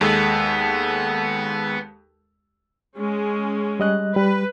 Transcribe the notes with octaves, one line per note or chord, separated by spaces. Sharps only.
D#2 G#3 B3 A4
G#3 C#4
G3 D#5 F#6
G3 B4